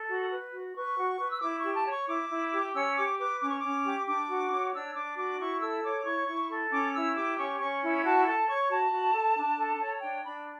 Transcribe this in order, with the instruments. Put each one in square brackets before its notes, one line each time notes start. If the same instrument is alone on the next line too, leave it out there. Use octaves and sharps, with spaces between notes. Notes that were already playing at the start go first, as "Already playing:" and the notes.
Already playing: [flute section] A4
F#4
B4
F#4
B4 C#6
F#4
B4
E6
E4 D6
C#6
G4
A5
C#5
C#6
E4 D6
E4
G4
C#4 E6
G4 D6
B4 D6
C#4 D6
C#6
C#4 D6
G4
D4 D6
F#4
C#5
D4 E6
D4 D6
F#4 D6
E4 C#6
A4 E6
C#5 D6
E4 C#6
E4
A4
C#4 D6
E4 E6
G4 D6
C#4 C#6
C#4 C#6
E4
F#4 A5
A4 A5
C#5 C#6
F#4 A5
F#4
A4
D4
A4
C#5
D4 G5
D4 B5